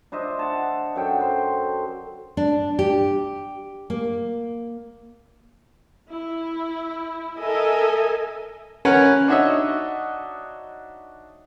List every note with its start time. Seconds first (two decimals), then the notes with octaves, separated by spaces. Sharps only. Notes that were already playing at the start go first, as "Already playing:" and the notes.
0.12 D4 C5 D#5 E5
0.39 F#5 A5
0.95 F#2 F#4 A4 G5
1.21 C5
2.37 D4
2.79 G4
3.90 A#3
6.10 E4
7.39 A4 A#4 D#5 E5 G#5
8.85 C#4 A#4 B4 F#5
9.28 D4 D#4 F#4 C#5 D#5 E5